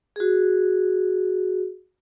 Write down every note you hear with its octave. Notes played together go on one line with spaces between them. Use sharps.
F#4 G#4